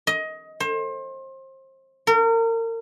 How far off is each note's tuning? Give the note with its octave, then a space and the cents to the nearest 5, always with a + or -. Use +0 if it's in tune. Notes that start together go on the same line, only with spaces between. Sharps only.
D#5 +20
C5 +30
A#4 -35